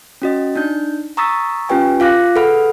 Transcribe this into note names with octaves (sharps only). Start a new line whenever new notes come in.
C#4 F#4 D#5
D4 D#4 G6
A#5 C#6 D#6 E6 A6 B6
C#4 F4 G4 B4 G5 G#5
F4 F5 D6 F#6 A#6
G#4 A4 B4 F#5 B5 F6